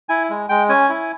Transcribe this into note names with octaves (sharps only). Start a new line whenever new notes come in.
E4 G#5
G#3
G#3 G5
C#4 G#5
E4